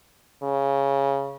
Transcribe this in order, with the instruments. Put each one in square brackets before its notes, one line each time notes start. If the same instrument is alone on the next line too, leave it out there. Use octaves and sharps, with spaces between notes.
[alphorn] C#3